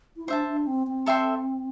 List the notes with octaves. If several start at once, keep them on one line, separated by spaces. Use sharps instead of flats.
E4
D4 C5 E5 A5
D4
C4
C4
A4 E5 G5 C6